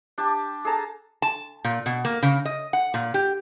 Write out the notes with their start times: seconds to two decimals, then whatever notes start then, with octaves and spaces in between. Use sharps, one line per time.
0.18 D4 G4 A5
0.65 G#4 A4 A5 A#5
1.22 A5
1.64 A#2
1.86 B2
2.05 A#3
2.23 C#3
2.45 D#5
2.73 F#5
2.94 A#2
3.14 G4